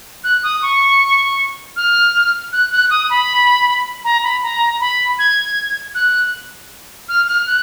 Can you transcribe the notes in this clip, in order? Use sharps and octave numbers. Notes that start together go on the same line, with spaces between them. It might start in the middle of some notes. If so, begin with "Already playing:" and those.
F#6
D#6
C#6
F6
F#6
F#6
D#6
B5
A#5
B5
A#5
B5
G#6
F#6
F6
F6
F#6